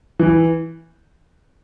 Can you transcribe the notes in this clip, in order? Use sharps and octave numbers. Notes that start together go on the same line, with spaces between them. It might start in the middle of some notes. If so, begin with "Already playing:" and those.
E3